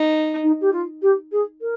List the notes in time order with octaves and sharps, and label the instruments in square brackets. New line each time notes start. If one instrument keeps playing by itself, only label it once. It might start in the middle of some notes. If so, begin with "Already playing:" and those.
Already playing: [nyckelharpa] D#4
[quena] D#4
G4
F4
G4
G#4
A#4